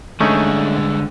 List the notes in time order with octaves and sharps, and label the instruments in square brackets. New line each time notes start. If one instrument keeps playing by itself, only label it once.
[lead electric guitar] G2 G#3 [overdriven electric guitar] D3 [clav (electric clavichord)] A3 C#4 D#4